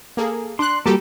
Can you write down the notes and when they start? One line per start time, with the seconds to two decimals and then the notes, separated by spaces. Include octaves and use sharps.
0.17 A#3 G#4 A4
0.59 D4 C6 F#6
0.86 G3 A#3 F#4 G4 A4